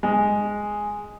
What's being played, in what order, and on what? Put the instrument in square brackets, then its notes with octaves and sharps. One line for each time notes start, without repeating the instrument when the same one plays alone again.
[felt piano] G#3